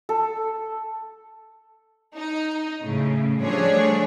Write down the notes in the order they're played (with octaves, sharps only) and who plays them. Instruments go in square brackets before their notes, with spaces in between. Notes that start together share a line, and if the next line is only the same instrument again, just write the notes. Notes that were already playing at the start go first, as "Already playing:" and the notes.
[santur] A4
[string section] D#4
A2 C#3
F3 G3 A3 D4 G#4 C#5